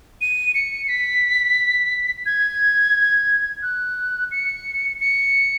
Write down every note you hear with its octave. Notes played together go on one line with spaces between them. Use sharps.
D#7
C#7
B6
G#6
F#6
C#7
C#7